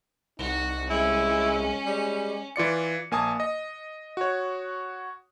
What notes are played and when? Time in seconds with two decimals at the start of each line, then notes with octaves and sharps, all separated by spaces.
0.39 C2 D#4 F#4
0.90 G#3 C#4 E4
1.86 G3 G#3
2.56 E3 F4 D5 C#7
3.11 A#1 A#3 G#5 A5 D#6
3.40 D#5
4.17 F#4 C#5